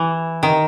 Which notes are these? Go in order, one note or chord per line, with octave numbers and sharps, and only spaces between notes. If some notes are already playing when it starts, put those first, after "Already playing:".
Already playing: E3
D#3